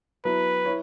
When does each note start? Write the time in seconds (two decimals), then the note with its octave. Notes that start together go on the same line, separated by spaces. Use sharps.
0.25 F#3 B3 E4 B4
0.65 E4 C#5